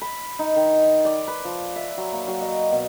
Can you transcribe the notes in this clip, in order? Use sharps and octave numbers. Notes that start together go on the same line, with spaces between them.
B5
D#4
D#3
D5
B4
F3
E5
F#3
A#3
F#3
D#5
B2